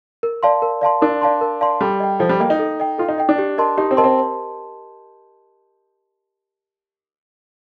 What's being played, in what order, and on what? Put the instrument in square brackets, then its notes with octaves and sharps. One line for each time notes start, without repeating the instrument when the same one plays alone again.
[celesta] A#4
D5 F5 A5 C6
A#4
D5 F5 A5 C6
[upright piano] D4 [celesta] A#4
[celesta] D5 F5 A5 C6
A#4
D5 F5 A5 C6
[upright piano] G3 [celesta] A4
[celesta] D#5 G5
[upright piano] F3 [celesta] A4
[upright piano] G3
[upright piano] A#3 [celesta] D#5 G5
[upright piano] D#4
[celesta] A4
D#5 G5
[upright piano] F4 [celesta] A4
[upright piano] D#4
[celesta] D#5 G5
[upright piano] D4
[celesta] G4
A#4 D#5 A5 C6
[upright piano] D#4 [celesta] G4
[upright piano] C4
[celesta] A#4 D#5 A5 C6
[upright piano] C4